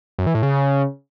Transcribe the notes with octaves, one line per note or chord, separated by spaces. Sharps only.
F#2
E3
A2
C#3